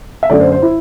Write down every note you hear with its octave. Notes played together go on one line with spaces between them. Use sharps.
E5
F#2 D3 A3 D5
C5
C5
E4